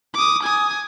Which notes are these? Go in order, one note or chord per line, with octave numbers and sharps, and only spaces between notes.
D6 D#6
G#5 D#6